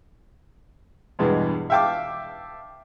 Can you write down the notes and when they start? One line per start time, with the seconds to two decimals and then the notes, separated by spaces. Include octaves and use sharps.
1.19 E2 G2 B2 G#3
1.70 E5 F5 G5 A5 D6